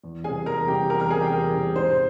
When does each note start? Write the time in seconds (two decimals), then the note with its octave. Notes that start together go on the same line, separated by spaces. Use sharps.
0.04 E2
0.24 C3 G3 G#4 G#5
0.46 E2 A#4 A#5
0.68 C3 G3 G4 G5
0.89 E2 A#4 A#5
1.00 A#4 A#5
1.10 C3 G3 G#4 G#5
1.21 G4 G5
1.32 E2 A#4
1.54 C3 G3
1.75 G#2 C5